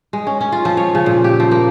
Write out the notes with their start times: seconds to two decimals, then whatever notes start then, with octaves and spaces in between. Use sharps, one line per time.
0.13 G#3
0.27 C#4
0.41 C#4
0.52 F4
0.65 F3
0.77 C#5
0.95 C#3
1.06 A#2
1.24 G4
1.40 F3
1.51 A#3